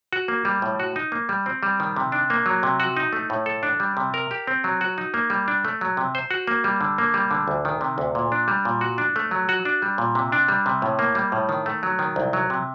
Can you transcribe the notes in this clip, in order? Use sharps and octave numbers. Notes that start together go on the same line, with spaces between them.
F#4
A#3
G3
A2
F#4
D#4
A#3
G3
C4
G3
D#3
C3
D4
A#3
F#3
C3
F#4
D#4
A3
A2
A4
D4
G3
C3
A#4
G4
C4
F#3
F#4
D#4
A#3
G3
D4
A3
F#3
C3
C5
F#4
A#3
G3
D3
A#3
G3
D3
D2
D#3
C3
D2
A#2
D4
G3
A#2
F#4
D4
A3
F#3
F#4
D4
G3
A#2
C3
D4
G3
C3
A2
A#3
G3
A2
D#3
A3
F#3
D#3
C2
F#3
C3